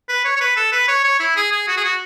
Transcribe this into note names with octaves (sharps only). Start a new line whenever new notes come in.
B4
C#5
C#5
B4
A4
B4
C#5
C#5
E4
G#4
G#4
F#4
G#4
F#4